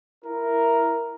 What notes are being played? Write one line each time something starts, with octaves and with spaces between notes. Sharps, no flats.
E4 A#4